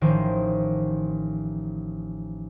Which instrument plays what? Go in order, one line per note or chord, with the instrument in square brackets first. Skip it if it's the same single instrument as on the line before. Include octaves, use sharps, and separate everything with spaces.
[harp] A1 D#3 F3 C5